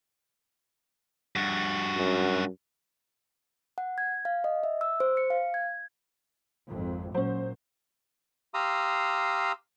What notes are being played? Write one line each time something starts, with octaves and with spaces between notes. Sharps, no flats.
G2 F#4
F#2
F#5
G#6
F5
D#5
E5
E6
C5
C#7
F5
G#6
G#1 F2
A#2 F#3 C#4 C5
G4 F5 A#5 C6 D#6 E6